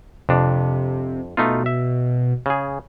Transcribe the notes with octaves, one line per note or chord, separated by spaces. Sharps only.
F2 C3 D4
B2 A3 D#4 F4
E5
C#3 G#4